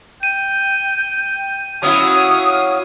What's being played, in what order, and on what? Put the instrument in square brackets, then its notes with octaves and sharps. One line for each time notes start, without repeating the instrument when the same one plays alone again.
[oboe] G5 [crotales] D#7
[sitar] F#3 C#4 E4 [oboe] F5 [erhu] D#6